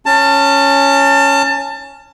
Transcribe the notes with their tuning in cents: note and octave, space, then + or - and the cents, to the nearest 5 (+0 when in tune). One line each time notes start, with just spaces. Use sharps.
C#4 +0 A5 +25